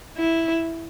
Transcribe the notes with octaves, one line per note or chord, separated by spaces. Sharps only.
E4